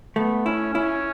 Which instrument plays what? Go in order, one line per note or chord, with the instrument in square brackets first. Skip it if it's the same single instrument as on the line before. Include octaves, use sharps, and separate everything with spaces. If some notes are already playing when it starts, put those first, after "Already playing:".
[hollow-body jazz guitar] A3 [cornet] B3
[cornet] C#4 [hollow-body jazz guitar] E4
[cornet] C#4 [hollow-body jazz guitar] E4